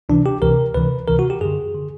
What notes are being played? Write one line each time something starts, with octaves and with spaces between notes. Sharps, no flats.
C#2 C3 E3 D4
G4
C#2 C3 E3 A#4
C#2 C3 E3 B4
C#2 C3 E3 A#4
F#4
G4
F#2 D3 G#4
D3